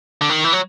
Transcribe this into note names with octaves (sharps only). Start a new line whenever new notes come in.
D3
D#3
E3
F#3